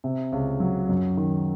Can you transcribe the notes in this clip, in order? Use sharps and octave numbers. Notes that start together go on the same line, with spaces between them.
C3
C#2
F#3
F#2
D#3